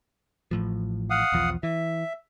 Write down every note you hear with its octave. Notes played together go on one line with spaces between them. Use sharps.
A1 A2 F3
F5 F#5 D#6
B1 E2 F3
E3 E5